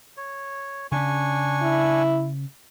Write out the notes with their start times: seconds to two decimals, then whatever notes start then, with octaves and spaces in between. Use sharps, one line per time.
0.17 C#5
0.92 C#3 C#4 D4 G#5 C#6
1.62 E4